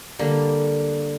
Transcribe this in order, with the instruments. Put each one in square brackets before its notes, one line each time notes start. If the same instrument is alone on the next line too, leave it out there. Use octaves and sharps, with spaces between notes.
[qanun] D3 G3 A#3